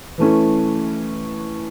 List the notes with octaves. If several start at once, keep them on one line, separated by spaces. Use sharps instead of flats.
E3 A3 C#4 E4